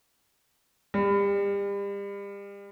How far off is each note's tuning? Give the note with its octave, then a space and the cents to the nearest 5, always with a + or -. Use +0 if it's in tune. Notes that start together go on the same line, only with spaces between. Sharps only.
G3 +35